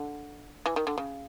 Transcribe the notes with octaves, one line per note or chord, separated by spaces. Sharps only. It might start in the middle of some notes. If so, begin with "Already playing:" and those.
Already playing: D3
E3
D#3
D3
C#3